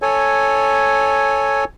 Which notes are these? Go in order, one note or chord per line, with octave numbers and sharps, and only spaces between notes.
A4 C#5 G#5